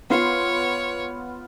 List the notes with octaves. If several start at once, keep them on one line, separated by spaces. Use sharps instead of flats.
B3 F4 C#5 C7